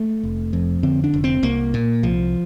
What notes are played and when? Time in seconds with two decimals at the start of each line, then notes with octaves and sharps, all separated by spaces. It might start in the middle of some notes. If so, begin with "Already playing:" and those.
Already playing: A3
0.23 F1
0.53 F2
0.83 D3 C4
1.04 D4
1.14 F1
1.24 C4
1.43 C2 A#3
1.74 A#2
2.03 C2 F3